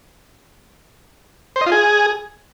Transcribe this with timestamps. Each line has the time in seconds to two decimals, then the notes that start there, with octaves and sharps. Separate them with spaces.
1.56 C5
1.61 D#5
1.66 F4
1.72 G#4